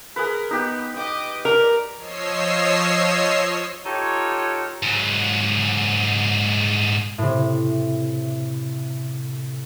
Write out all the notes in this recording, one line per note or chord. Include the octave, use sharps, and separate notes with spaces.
G#4 A#4 B4
B3 D#4 G4
D#5 G5 D6
A#4 D5
F3 C#5 D#5 E6 C7
D#4 F4 G4 A4 C#5
G#2 F#3
A2 C3